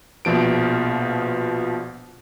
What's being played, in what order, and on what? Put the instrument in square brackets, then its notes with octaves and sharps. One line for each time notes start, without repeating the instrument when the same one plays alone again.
[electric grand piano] A#1 B2 F3 D7